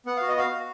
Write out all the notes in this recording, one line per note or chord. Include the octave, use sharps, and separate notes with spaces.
B3 F#5
F#4 F5
D#5
F#4 F5
F#4